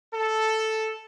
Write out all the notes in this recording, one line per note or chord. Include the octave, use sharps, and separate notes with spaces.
A4